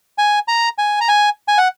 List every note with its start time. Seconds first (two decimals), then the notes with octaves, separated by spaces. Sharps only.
0.18 G#5
0.48 A#5
0.78 G#5
1.01 A#5
1.08 G#5
1.48 G#5
1.58 F#5